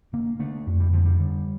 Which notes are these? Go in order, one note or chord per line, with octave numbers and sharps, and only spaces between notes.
D3 A#3
D3 A3
F2
G3
D3 F3
G3
D3